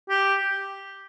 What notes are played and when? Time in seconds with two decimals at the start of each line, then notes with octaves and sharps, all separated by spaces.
0.10 G4